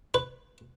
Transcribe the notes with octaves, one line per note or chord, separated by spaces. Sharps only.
B4